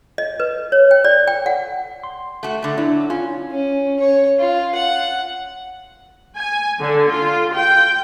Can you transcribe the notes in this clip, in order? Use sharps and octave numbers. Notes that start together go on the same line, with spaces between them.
D#5
B4
C#5
G5
D5
G5
F#5
C6
A3 F#4
D3 A3
F#3 D4 E4
C#4 F4
C#4
C#5
F4
F#5
G#5
D3
F4
G5